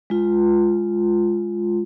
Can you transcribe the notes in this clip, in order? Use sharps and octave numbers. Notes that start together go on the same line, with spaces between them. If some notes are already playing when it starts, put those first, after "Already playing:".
G#3 F4